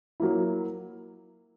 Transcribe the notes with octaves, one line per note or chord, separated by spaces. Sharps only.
F#3 A#3 E4